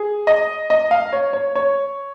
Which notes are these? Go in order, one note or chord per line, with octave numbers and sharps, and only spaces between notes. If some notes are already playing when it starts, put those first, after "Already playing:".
Already playing: G#4
D#5
D#5
F5
C#5
C#5
C#5